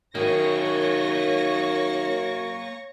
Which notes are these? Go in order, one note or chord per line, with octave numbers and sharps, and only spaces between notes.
F#2 D#3 A#3 G#4 C#5 C#6 A#6